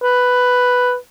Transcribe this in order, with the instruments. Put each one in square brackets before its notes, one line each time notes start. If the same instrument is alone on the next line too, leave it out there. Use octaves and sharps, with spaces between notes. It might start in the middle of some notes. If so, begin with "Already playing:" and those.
[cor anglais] B4